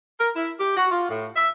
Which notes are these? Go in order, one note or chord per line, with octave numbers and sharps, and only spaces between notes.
A#4
E4
G4
F#4
F4
A2
E5